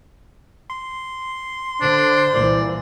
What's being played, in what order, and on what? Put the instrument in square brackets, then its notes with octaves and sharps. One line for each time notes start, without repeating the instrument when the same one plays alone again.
[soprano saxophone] C6
[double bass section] D3 [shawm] D4 [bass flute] C5
[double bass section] C2 A#2 E3 [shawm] D5